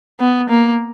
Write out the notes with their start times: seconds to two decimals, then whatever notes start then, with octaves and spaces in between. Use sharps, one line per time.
0.20 B3
0.50 A#3